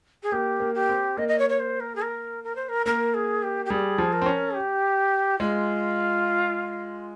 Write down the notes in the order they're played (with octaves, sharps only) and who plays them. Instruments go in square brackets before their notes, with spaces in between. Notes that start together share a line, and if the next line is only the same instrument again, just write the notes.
[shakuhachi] G#4
[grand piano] A#3 [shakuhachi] G4
[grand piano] A#3
[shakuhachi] G4
[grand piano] C4
[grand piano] A#3 [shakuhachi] D#5
[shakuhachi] D#5
C#5
C#5
C5
A#4
G#4
A#4
A#4
C5
A#4
[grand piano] A#3 [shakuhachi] A#4
[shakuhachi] G#4
G4
G4
[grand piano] G3 [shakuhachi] G#4
[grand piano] F3
[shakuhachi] A#4
[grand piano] C4
C#4
[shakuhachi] G4
[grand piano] G#3 [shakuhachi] F4